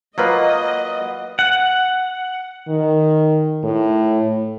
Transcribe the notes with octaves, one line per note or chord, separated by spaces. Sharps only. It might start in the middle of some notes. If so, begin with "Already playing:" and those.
F#3 A#3 F4 B4 D#5 F5 F#5
F#5
D#3
A2